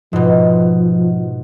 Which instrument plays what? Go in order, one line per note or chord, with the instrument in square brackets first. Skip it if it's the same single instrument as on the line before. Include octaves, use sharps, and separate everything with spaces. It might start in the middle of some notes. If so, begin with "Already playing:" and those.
[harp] G#2 B2 [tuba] F3